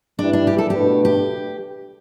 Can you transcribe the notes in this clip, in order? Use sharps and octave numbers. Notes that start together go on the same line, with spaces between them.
G3 D4 E4 B4
D4
G4
A4
G4
B2 A3 D4 B4
G4